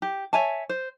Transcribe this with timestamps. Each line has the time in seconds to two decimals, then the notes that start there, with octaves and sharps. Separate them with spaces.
0.02 G4
0.33 C#5 E5 G#5 A5
0.69 C5